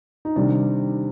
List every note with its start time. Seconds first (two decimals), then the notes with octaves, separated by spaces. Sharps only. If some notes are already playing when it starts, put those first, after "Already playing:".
0.25 D#4
0.36 C3 D#3 G3 D4